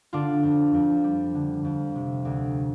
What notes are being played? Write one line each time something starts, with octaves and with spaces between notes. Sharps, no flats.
D3 D4 F4
F2
F2
G3
D3
F2
C3
D2